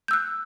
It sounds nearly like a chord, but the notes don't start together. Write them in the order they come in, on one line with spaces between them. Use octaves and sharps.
G6 E6 F#6